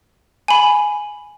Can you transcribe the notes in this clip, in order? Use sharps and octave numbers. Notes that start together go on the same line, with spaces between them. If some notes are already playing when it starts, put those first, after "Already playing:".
G#5 B5